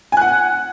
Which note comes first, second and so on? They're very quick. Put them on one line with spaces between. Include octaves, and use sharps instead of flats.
G#5 F#6 F#5